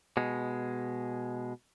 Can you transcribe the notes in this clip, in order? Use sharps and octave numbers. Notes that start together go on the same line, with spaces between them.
B2 G#3